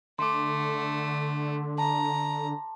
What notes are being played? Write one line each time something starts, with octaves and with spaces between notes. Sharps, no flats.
D3 A3 C6 D6
A5 A#5